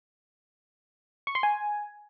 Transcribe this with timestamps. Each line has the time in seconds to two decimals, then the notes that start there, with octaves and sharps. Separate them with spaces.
1.27 C#6
1.35 C6
1.43 G#5